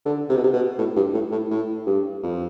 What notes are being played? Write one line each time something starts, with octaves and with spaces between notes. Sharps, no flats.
D3
C3
B2
C3
B2
A2
G2
A2
A2
A2
G2
F2